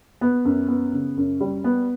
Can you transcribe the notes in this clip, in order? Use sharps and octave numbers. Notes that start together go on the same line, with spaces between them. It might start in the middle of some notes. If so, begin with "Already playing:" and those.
B3
F#2
B3
C#3
F#2
G3
B3